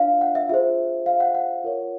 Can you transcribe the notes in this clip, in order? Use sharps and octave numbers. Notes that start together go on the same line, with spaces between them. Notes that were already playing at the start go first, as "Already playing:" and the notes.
Already playing: D4 F4 C#5 E5 F5
F#5
E5
F4 G#4 C5 E5
F5
F#5
F#5
F4 A#4 C#5